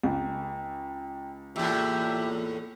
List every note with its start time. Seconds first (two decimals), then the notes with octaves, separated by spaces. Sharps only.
0.04 C#2 G5 A#5
1.56 E2 A2 A#3 F4 G4 E5